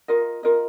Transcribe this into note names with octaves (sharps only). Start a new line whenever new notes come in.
F4 A#4 D#5
F4 A#4 D#5